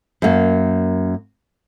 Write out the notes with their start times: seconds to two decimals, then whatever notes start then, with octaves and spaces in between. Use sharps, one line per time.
0.22 F#2 A#3